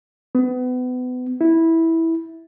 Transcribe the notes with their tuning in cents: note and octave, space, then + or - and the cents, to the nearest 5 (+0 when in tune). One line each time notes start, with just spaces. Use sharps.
B3 +30
E4 -10